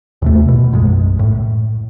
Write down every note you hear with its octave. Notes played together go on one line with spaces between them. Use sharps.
D#2 C3 A3
B2
B1 F#2 D#3 G#3
A2